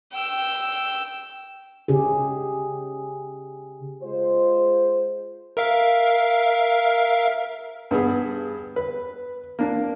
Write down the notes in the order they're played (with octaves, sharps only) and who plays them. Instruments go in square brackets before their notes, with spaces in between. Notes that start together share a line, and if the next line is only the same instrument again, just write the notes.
[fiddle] G5 E6
[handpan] C#3 G4 G#4
[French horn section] G#3 F4 C5
[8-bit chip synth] A#4 E5 F5
[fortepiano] G2 B3 G#4
B4
A#3 D4